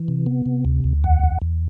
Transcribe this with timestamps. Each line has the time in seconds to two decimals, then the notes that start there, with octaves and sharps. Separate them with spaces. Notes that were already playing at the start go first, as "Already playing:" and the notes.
Already playing: E3
0.08 C3
0.26 B3
0.46 C3
0.65 D2
0.84 D2
1.04 E2 F#5
1.23 E2
1.42 E2